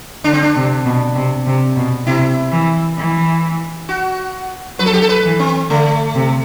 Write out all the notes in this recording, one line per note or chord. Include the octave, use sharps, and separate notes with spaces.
D3 D4
C4
D4
C3
B2
C3
C3
B2
C3 E4
E3
E3
F#4
F#3 B4
A4
G4
A4
B4
E3
C4
D3 A3
C3